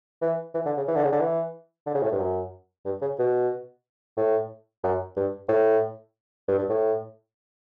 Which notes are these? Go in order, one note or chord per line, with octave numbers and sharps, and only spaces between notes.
E3
E3
D3
C#3
E3
D3
C#3
D3
E3
D3
C#3
A2
G2
F#2
G2
C#3
B2
A2
F#2
G2
A2
G2
G2
A2